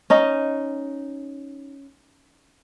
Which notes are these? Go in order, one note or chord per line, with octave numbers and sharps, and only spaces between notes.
C#4 D#4 D#5